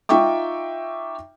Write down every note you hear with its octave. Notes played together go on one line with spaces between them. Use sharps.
D#4 F4 E5 G5 C#6 D6